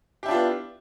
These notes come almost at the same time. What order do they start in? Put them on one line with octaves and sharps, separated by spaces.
G4 E4 D4 F4 B3